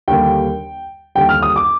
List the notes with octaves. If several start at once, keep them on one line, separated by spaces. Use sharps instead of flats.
D#2 D3 G3 A#3 G5
D#2 D3 G3 G5
F6
D#6
D6